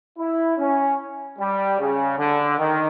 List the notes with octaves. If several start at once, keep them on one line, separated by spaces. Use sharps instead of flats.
E4
C#4
G3
C#3
D3
D#3